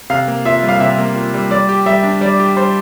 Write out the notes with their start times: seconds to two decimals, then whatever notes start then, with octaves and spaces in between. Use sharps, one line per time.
0.10 C3 F5
0.28 A#3
0.45 F4 E5
0.63 G3
0.68 F5
0.80 C3 E5
0.98 A#3
1.16 F4
1.34 G3
1.51 G3 D5
1.69 G4
1.86 G3 E5
2.04 D4
2.21 G3 D5
2.40 G4
2.57 G3 C5